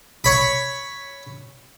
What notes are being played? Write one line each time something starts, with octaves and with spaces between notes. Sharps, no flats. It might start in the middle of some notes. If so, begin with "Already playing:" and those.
C#5 B5